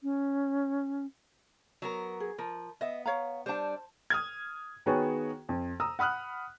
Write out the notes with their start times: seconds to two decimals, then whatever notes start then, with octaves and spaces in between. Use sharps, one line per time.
0.03 C#4
1.82 F#3 B3 A#4
2.20 G#4
2.38 F3 A#4
2.81 B3 D#5 E5
3.06 C#5 F5 A#5
3.46 G3 D4 C5 A5
4.10 D#6 F6 G#6
4.86 D#3 B3 F#4 G#4 C#5
5.49 F2
5.80 A#5 D#6 E6
5.99 F#5 B5 D#6 F6 F#6